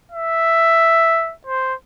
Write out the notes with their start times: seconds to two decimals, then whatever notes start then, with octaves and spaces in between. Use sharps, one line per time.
0.11 E5
1.47 C5